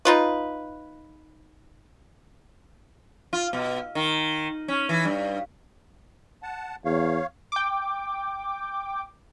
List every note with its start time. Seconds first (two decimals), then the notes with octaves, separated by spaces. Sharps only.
0.05 D#4 F4 B4
3.33 F4
3.53 B2
3.95 D#3
4.68 C#4
4.89 E3
5.05 G2
6.43 F#5 A5
6.85 E2 C#5 F5
7.52 G5 D6